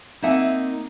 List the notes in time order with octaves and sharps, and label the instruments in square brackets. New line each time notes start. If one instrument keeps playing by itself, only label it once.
[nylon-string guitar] A#3 C4 D#4 E5 F#5 G#5